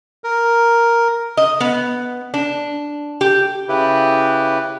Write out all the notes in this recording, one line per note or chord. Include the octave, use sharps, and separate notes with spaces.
A#4
D#5
B3
D4
G4
C#3 E4 G4 B4